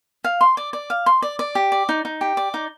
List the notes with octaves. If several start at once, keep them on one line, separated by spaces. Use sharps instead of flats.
F5
C6
D5
D5
F5
C6
D5
D5
G4
D5
D#4
D#4
G4
D5
D#4